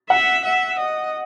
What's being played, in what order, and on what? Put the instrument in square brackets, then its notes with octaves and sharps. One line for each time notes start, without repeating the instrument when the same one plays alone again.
[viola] E5 [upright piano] F#5
[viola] E5
D#5